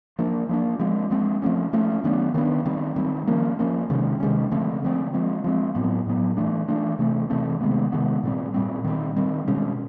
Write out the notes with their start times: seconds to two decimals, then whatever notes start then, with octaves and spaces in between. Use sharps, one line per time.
0.19 F3 A#3 D4
0.49 F3 A#3 D4
0.79 F3 G#3 C4
1.10 F3 G#3 C4
1.42 F3 A3 C#4
1.73 F3 A3 C#4
2.04 D#3 F#3 B3 D4
2.34 D#3 F#3 B3 D4
2.65 D#3 G3 C4
2.96 D#3 G3 C4
3.27 F3 A#3 C#4
3.59 F3 A#3 C#4
3.90 C3 D#3 G#3 C#4
4.20 C3 D#3 G#3 C#4
4.51 D3 F3 A3 C4
4.83 D3 F3 A3 C4
5.14 F3 G#3 C4
5.44 F3 G#3 C4
5.75 A2 F#3 B3
6.07 A2 F#3 B3
6.37 E3 A3 D4
6.68 E3 A3 D4
6.99 C3 E3 A3 C4
7.30 C3 E3 A3 C4
7.61 C3 D#3 G#3 B3
7.92 C3 D#3 G#3 B3
8.23 A#2 G3 C4
8.54 A#2 G3 C4
8.84 D#3 G3 C4
9.16 D#3 G3 C4
9.48 B2 G#3 C#4